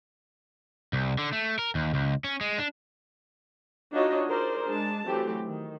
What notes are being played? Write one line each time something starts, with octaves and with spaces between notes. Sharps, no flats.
C2
D3
A3
A#4
D#2
C#2
C#4
G#3
D4
D4 D#4 F4 F#4 C#5 D#5
G#4 A#4 C5 D5
G#3 D4 A5
E3 F#3 A3 C4 G4
D#3